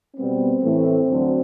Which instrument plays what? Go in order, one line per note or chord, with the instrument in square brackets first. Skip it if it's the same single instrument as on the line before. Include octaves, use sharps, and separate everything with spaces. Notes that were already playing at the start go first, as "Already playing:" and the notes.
[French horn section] B2 G3 B3 C4
A2 E3 A3
D2 D3 F#3